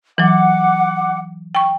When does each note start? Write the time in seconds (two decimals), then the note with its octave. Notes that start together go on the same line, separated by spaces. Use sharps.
0.18 E3 F#3 F#5 D6
1.55 G5 C#6